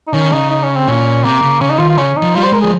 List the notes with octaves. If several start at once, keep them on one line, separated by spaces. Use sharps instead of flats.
D#4
D#3 C#4
C#3 D#4
D#4
C#4
C4
A#2 C#4
C3 A#3
C#3
C#3 C#4
D#4
D#3 F4
F4
C#3 C#4
D#4
F3
G3 F4
C5
G#3 A#4
F3 G#4